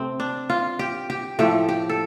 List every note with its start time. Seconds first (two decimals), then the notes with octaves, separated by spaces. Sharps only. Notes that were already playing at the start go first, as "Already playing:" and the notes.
Already playing: C3 A3 C4
0.20 D4
0.50 F4
0.79 G4
1.10 G4
1.39 A2 F3 A3 G4
1.69 G4
1.89 A4